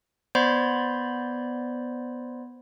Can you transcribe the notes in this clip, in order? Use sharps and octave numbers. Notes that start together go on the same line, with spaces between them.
B3 C5 D5 B5 C6 G#6